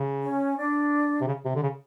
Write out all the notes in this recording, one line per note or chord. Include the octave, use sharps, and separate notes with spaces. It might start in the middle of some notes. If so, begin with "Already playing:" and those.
Already playing: C#3
C#4
D4
C3
C#3
C3
D3
C#3